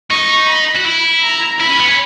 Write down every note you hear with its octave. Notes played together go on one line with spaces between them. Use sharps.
D#4 C#6
B5
F#4
E4
A#5
E4 B5
C#4
B3
C#4